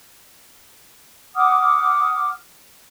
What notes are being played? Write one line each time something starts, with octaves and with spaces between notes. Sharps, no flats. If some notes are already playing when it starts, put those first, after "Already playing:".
F#5 D6 D#6 F6